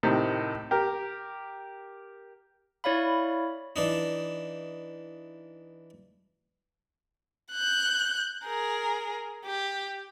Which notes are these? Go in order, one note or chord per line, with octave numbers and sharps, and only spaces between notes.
A2 C3 D#3
G4 A#4
E4 C#5 D5 F5 B5
E3 D4 D#4
F#6 G6
G#4 A#4
G4